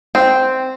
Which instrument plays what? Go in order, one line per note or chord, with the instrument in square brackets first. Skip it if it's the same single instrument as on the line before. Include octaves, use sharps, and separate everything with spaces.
[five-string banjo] C4